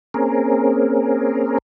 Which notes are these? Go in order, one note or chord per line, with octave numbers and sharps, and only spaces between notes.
A#3 C4 C#4 G#4 A#4